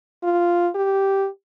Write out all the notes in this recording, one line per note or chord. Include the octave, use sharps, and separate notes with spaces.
F4
G4